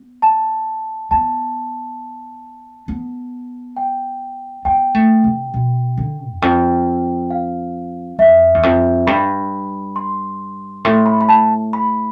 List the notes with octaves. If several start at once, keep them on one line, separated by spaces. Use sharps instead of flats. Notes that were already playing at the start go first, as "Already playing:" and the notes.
Already playing: B3
A5
B3 A5
B3
G5
B3 G5
A3
C3
B2
D3
E2
F2 G5
F5
F2 E5
E2
F2
G2 B5
C6
A2 C6
B5
B5
A5
B5